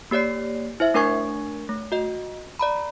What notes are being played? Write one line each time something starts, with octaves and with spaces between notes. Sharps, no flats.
A#3 G4 C#5 D5 C7
E4 C5 E5
A3 D4 A#4 G#5 C#6 G#6
A3
F#4 D#5
D5 A#5 B5